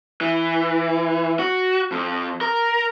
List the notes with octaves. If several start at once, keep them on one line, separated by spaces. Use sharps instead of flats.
E3
F#4
F2
A#4